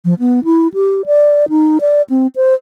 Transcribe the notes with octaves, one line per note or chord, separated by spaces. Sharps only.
F3
B3
E4
G4
D5
D#4
D5
C4
C5